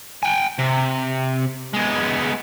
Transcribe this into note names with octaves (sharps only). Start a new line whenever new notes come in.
G5 G#5
C3
G#3 B3